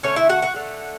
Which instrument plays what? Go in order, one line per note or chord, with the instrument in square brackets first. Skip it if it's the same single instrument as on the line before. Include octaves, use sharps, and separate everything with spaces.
[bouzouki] D3 A3 C#4 C#5
E4 E5
F#4 F#5
F#4 F#5
D3 A3